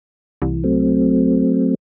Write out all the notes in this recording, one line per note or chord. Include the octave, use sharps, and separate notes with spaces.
C2 E3
F#3 A3 C4